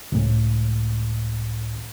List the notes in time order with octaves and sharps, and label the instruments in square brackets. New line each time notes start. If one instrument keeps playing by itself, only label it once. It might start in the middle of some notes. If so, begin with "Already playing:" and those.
[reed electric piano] C#2 A2